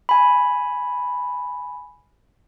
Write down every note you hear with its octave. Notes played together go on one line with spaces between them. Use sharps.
G#5 B5